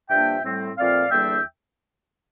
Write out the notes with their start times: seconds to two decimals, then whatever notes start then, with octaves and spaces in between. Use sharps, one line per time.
0.10 G2 F3 A#3 D4 E5 G5
0.44 A2 G3 C4
0.78 A#2 F3 A3 C4 D5 F5
1.11 E2 D3 G3 A#3 D4 E5 G5